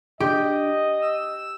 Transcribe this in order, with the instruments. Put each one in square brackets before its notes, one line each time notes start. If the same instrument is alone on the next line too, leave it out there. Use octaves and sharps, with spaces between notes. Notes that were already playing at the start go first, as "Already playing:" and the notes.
[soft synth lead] D4 [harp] G4 [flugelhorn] D#5
[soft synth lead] E6